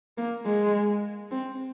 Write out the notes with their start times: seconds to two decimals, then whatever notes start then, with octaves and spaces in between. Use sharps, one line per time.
0.18 A#3
0.46 G#3
1.31 C4